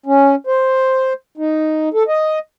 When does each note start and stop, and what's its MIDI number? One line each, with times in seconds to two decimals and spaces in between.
0.06 0.35 61
0.47 1.13 72
1.37 1.89 63
1.94 2.03 69
2.08 2.39 75